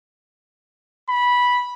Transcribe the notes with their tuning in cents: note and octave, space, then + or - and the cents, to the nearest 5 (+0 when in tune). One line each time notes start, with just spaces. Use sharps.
B5 -10